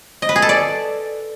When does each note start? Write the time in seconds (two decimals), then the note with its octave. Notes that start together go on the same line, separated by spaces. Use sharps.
0.22 D#5
0.29 B4
0.36 G#4
0.42 A4
0.49 D5